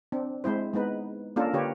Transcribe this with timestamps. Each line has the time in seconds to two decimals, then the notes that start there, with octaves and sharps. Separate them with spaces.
0.12 C4 D4
0.44 G#3 C4 E4 C5
0.73 G#3 B3 D#4 B4
1.36 A#3 C#4 D4 F4 A4 A#4
1.53 D3 F4 G4 B4 C#5